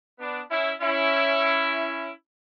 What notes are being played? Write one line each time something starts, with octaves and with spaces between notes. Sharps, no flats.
B3 D4
C#4 E4
C#4 E4